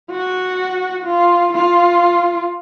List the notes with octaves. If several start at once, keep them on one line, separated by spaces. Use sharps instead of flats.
F#4
F4
F4